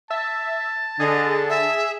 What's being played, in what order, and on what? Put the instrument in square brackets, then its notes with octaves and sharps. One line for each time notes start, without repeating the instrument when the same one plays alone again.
[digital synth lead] E5 [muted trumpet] A5
[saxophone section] D3 [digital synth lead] G#4 [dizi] D#5
[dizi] E5